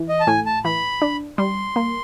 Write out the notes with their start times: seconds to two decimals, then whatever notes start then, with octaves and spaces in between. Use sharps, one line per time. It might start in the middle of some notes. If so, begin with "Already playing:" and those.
Already playing: E3
0.09 D#5
0.20 A5
0.27 A2 G#5
0.46 A5
0.65 E3 B5
1.02 D4
1.38 G3 C6
1.76 A#3